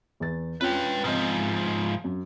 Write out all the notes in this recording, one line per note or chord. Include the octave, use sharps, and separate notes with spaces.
E2 A6
C#4 F4 B4 G5
G#2 F3 C4 D#5
F#2